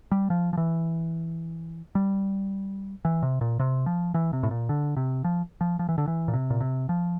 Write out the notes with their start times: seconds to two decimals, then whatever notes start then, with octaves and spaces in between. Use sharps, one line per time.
0.12 G3
0.30 F3
0.53 F3
0.57 E3
1.95 G3
3.05 E3
3.23 C3
3.41 A#2
3.59 C3
3.86 F3
4.14 E3
4.33 C3
4.43 A2
4.51 A#2
4.69 D3
4.97 C3
5.24 F3
5.61 F3
5.79 F3
5.89 E3
5.98 D3
6.08 E3
6.28 A#2
6.34 C3
6.50 A#2
6.61 C3
6.89 F3